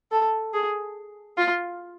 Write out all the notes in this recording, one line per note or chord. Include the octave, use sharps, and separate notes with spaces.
A4
G#4
F4